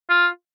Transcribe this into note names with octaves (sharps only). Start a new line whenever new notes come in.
F4